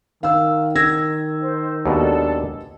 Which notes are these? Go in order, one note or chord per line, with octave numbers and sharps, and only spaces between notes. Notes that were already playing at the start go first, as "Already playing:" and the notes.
D#3 F5 E6
E6 G#6 A#6
C5
D#2 B2 G#3 D4 A4